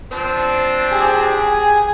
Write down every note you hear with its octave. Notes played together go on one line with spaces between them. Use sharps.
F3 C4 D4
G4 G#4
G#5